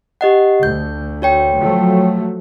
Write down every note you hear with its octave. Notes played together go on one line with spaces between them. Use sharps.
G4 D#5 F#5
D2 G6
F#4 C#5 G5
F3 F#3 A3